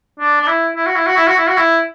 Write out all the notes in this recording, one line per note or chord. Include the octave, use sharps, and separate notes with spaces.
D4
D4
E4
E4
F#4
E4
F#4
E4
F#4
E4
F#4
E4